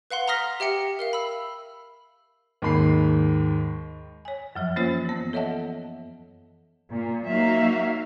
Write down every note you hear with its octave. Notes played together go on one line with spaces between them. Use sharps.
B4 F5 F#5 C6
A#5 C6 D#6 F6 A#6 B6
G4 E5 G5 C#7
A#4 E5 F5
B5 E6
D#2 G#2 B5 C7
C#5 G#5
F#2 F3 F#3
E3 A#3 C#4 F4 C5 C#5
E3 B3
A4 C#5 D#5 E5 F#5 A5
A#2
F#3 A#3 D#4 F#4 E5 F5